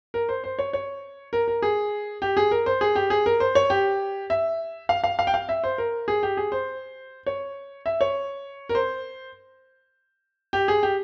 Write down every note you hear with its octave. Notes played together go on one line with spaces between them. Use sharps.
A#4
C5
C5
C#5
C#5
A#4
A#4
G#4
G4
G#4
A#4
C5
G#4
G4
G#4
A#4
C5
C#5
G4
E5
F5
F5
F5
G5
F5
E5
C5
A#4
G#4
G4
G#4
C5
C#5
E5
C#5
A#4
C5
G4
G#4
G4